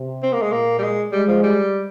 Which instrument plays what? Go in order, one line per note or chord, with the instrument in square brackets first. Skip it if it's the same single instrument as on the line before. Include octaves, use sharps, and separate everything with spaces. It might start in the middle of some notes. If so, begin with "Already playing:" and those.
Already playing: [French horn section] C3
[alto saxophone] C4
A#3
G#3
[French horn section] A#2 [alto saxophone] A#3
[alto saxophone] G3
G#3
[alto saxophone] G3 [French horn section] G#3
[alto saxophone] F3
G3